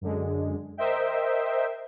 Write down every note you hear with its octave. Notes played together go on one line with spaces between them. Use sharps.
F#2 D3 G#3
A#4 C5 D#5 E5 G5